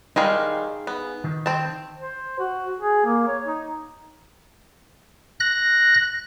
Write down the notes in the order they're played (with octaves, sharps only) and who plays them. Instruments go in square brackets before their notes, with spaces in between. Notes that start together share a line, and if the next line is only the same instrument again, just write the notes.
[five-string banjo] D#3 G3 G#3 [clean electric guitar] D#4 G#4 F5
[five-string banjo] B3
[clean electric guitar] D#3
[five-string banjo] C4 A5
[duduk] C5
F#4
G#4
A#3
C#5
D#4
[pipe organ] F#6 A#6